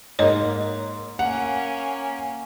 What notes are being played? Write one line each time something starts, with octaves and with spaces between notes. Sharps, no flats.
G#2 A#3 C#5 D#5
A#3 C#4 F#5